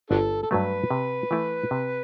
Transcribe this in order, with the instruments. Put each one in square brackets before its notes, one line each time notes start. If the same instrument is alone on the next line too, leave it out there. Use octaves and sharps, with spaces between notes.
[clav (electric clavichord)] G1 [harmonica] D4 F#4 A4
[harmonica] A4
[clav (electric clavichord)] G2 F#3 A3 [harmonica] B4
[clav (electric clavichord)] C3
E3 A3 E4
C3